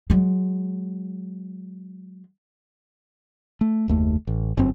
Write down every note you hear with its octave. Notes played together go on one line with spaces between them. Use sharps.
F#3 G#3
A3
F#1 D#2 A3
A1
G1 F#2 C4